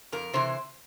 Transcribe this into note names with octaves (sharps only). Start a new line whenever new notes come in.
F2 A#4
C3 E3 C5